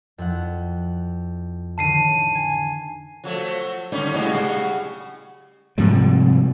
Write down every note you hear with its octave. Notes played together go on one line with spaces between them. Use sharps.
F2 E4 F#5
A1 D3 D#3 A5 C7 D#7
G#5
F3 F#3 A3
D3 G3 C#4 D#4
A2 C#3 F#3 G3 D#5
F#5
G#2 C3 F3 G3